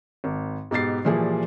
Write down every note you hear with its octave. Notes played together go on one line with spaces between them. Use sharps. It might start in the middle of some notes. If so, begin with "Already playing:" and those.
G#1
G#2 B2 G4 A6 C7
A#2 E3 F3 G3 G#4